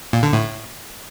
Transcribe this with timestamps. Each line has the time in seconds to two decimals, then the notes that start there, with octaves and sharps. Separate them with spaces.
0.13 A#2
0.23 D3
0.33 A2